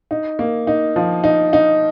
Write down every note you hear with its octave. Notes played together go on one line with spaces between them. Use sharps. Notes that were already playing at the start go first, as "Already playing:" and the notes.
D#4
A#3
D#4
F3
D#4
D#4